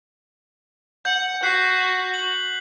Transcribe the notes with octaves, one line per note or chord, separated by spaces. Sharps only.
F#5 G6
F#4 F#6 B6 C7
F#7